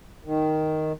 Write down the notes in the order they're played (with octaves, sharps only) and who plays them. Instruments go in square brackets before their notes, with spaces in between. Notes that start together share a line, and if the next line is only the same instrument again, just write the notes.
[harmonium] D#3